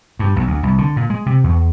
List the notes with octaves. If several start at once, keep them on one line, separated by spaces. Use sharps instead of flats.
G2
B1
D2
C2
D3
A#2
G#3
C3
E2